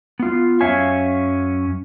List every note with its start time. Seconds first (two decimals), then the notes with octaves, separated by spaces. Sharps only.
0.20 B3 F4
0.61 F#2 C#4 E5 F5 G#5